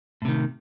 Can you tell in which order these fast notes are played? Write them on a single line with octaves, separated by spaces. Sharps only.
A2 C3 D#3